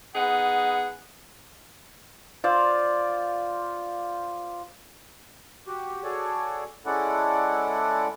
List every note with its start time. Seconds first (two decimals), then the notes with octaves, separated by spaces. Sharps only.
0.15 B3 D#4 G#4 F#5
2.44 F4 C5 D5
5.67 F#4 G4
6.04 F#4 G#4 A4 C#5 D5
6.86 G#3 C#4 E4 A4 D5 F#5